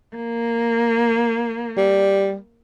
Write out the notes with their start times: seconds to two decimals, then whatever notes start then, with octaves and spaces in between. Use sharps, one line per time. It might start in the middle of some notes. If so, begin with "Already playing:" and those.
0.16 A#3
1.77 G3